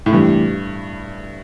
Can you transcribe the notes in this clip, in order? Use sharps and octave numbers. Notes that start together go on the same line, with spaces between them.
A2
G2 C3 E3 A3 E4 G4